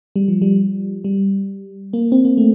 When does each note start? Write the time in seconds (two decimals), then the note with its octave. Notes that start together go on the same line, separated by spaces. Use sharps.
0.16 G3
0.28 F3
0.42 G3
1.04 G3
1.93 A#3
2.12 C4
2.25 A#3
2.37 A3